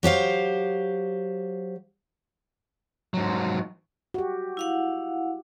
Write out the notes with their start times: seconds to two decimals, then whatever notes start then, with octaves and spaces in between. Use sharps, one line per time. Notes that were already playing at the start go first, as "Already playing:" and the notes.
0.03 F#3 G4 C5 F5
3.14 G#2 F#3
4.14 F#4 G4
4.57 E4 F5 F#5